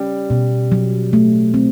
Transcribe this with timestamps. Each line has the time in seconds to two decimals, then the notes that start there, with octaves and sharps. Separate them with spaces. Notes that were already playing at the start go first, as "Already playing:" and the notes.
Already playing: G3 C#4
0.30 B2
0.72 F#3
1.13 A3
1.54 C4